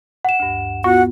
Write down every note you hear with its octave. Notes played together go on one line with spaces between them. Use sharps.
F#5 E7
D2 G2
B3 F4 F#4 F#5